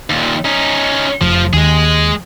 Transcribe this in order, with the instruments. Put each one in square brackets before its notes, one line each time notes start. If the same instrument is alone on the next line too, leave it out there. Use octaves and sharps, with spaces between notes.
[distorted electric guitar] D#2 A#2
C#4 D#4
[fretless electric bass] F1 [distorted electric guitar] F3
[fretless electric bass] D#2 [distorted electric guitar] G#3 G#4